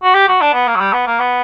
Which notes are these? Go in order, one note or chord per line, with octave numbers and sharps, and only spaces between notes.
F#4
G4
F#4
D4
B3
A#3
F#3
G3
B3
A#3
B3